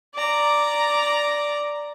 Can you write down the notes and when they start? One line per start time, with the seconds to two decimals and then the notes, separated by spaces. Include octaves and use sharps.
0.15 D5 A#5